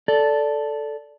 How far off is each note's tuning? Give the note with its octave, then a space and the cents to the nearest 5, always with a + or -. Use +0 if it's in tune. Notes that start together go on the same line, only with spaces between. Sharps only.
A4 +0 D5 -10